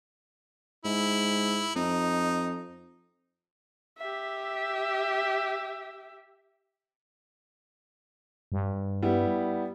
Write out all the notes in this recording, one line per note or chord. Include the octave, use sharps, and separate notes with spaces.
G#2 E4
F2 D#4
G4 E5
G2
G3 B3 E4